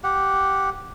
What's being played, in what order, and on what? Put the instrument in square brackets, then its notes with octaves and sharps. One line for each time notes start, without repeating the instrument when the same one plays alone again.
[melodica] G4 F#5